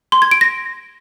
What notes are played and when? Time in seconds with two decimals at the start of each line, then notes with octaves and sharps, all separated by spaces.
0.12 C6
0.22 G#6
0.31 D7
0.41 A#6